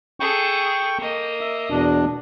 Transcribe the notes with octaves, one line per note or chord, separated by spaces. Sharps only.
G#4 A4 G5 C#6
A#3 D#5
E5
E2 B2 D4